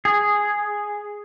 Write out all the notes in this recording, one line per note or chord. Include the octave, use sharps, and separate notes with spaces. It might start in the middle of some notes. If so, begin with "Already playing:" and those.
G#4